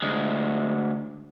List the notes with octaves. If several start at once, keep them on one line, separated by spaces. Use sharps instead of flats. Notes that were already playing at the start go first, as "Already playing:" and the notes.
D2 G#3